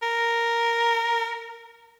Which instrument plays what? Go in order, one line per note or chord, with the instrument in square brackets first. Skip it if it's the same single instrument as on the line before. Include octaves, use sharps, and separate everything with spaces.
[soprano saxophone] A#4